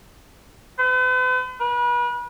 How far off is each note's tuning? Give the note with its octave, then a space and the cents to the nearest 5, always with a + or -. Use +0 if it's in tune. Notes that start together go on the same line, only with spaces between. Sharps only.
B4 +45
B4 -35